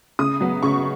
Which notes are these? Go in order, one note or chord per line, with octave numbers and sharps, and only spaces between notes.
C#3 D#6
F#3 B3
C#3 C#6